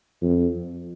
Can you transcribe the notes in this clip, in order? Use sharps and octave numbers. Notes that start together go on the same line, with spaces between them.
F2